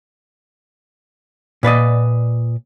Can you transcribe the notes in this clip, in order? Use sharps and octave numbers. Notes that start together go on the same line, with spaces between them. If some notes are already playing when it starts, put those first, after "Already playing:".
A#2 B4 D5 D#5